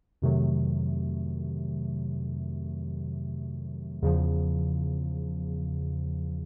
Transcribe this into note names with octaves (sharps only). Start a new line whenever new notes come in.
F2 C3 D#3 F#3 A3
E2 C#3 F3